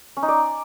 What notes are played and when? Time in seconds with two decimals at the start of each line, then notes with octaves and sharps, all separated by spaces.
0.17 C#4
0.23 D#4
0.28 D5